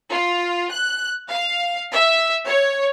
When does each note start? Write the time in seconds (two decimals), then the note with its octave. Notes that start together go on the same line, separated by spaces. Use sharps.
0.11 F4
0.71 F#6
1.28 F5
1.92 E5
2.46 C#5